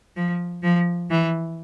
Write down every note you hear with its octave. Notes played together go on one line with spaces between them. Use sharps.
F3
F3
E3